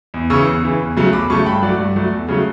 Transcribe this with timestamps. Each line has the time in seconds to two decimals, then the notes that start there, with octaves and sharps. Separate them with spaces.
0.14 E2
0.30 C#3 E3 C#6 E6
0.47 E2
0.63 C#3 E3
0.79 E2
0.96 C#3 F#3 A3
1.13 E2 B5 D6
1.30 C#3 F#3 A3 A5 C#6
1.46 G2 G5 B5
1.63 F#3 A3 D5 F#5
1.79 G2
1.96 F#3 A3
2.13 E2
2.28 C#3 F#3 A3